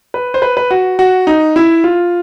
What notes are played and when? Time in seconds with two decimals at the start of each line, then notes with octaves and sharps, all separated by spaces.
0.14 B4
0.34 C5
0.42 B4
0.57 B4
0.71 F#4
0.99 F#4
1.27 D#4
1.56 E4
1.84 F4